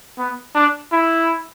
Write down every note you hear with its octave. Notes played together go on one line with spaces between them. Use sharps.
B3
D4
E4